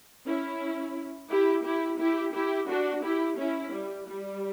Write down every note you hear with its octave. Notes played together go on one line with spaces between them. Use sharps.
C#4 E4
E4 G4
E4 G4
E4 G4
E4 G4
D4 F#4
E4 G4
C#4 E4
G3
G3